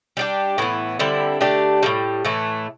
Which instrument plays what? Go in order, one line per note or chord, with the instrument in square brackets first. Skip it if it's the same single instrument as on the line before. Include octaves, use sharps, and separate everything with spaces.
[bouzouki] G3 D4 G4
A2 E3 B3
D3 G3 C4 E4
D3 A3 D4 G4
A2 E3 G3
A2 E3 A3